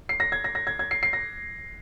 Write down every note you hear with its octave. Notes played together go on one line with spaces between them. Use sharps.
C7
A#6
G#6
A#6
A#6
G#6
G#6
C7
C7
A#6